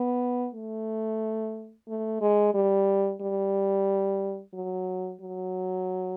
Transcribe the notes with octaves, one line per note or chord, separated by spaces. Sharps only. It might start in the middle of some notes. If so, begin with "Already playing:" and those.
Already playing: B3
A3
A3
G#3
G3
G3
F#3
F#3